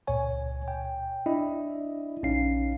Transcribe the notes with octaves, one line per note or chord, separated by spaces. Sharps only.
C#2 A#2 C#5 G#5
G5
D4 E4 D5 D#5
A#1 C#4 D#4 F5 C7